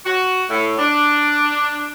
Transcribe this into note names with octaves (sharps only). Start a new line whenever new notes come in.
F#4
A2
D4